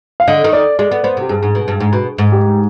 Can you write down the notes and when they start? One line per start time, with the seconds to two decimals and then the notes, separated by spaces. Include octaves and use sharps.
0.20 F5
0.28 D3 D#5
0.44 D#3
0.53 D5
0.79 G#3 D5
0.91 B3
1.03 B3 C5
1.17 C3 G4
1.29 G2 G#4
1.43 G#2
1.55 B2
1.68 G2
1.80 G#2
1.93 B2
2.18 G#2
2.32 G4